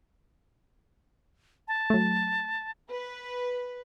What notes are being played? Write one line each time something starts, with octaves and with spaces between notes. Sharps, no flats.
A5
F#3 A3
B4